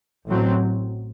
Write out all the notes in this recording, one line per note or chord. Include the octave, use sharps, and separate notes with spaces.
A1 A2 F#3 C4